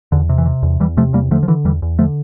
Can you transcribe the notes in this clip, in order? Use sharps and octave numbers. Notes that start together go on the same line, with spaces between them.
E2 D3
C3
E3
C3
E2
E2 E3 G3
C3 F3 A3
E2 G3 A#3
D3 F3 A3
F3
D3 E3
E2 E3 G3
E2
D3 F3 A3